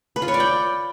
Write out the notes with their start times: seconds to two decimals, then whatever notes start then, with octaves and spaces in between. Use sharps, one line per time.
0.16 B4
0.22 F4
0.28 C#5
0.34 D5
0.40 G5